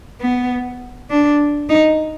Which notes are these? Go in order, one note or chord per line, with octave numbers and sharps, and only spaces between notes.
B3
D4
D#4